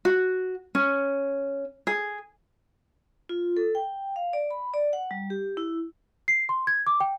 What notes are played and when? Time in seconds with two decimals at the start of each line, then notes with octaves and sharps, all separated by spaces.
0.05 F#4
0.75 C#4
1.87 G#4
3.29 F4
3.57 A4
3.75 G5
4.16 F5
4.33 D5
4.50 B5
4.74 D5
4.93 F#5
5.11 G3
5.30 G4
5.57 E4
6.28 C7
6.49 C6
6.67 G#6
6.87 D6
7.00 G5